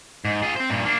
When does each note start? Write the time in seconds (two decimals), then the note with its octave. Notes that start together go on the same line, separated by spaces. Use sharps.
0.25 G#2
0.42 F4 G#4
0.56 C4 C5
0.70 G2 A#2
0.85 A#3 D4